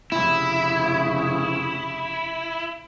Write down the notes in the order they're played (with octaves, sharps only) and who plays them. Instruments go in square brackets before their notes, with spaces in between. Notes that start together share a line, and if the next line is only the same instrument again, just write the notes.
[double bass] F1 C#3 [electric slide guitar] E4